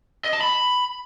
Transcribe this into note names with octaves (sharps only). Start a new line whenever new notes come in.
D#5
A5
B5